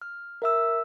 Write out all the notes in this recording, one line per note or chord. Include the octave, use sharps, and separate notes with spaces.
F6
A#4 E5 E6